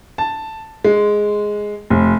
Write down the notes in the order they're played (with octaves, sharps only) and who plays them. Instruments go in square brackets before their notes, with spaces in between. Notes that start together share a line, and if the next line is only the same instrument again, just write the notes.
[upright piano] A5
G#3
F1